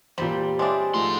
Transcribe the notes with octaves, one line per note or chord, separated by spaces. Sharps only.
E2 A#2 G3 C4 C5
G#3 C4 D4 C5 C#5 E5
G#2 F3 A3 C6